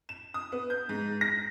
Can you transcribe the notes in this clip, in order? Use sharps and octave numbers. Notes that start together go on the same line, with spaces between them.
E7
D#6
B3
G6
G#2
A#6